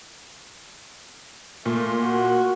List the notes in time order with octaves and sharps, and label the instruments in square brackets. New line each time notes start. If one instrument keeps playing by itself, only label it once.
[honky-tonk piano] A#2 [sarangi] A3
[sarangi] F#4